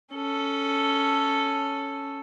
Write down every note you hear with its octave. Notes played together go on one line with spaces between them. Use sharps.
C#4 A4